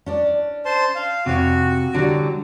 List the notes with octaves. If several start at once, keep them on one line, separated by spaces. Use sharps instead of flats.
C#4 D4 D5
C5 A5 C6
F5
F2 C3 F#4 C#5
D3 F#3 G3